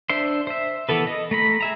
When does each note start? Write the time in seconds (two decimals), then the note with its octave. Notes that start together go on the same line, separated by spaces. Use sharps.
0.09 D4 C5 E5 C6
0.47 C5 E5
0.89 E3 B3 A4 B4
1.07 D#5
1.31 A3 A#5 B5
1.61 G#4 E5 A#5